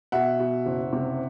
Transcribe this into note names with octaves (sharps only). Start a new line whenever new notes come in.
B2 E5 F#5
B2
F#1
C3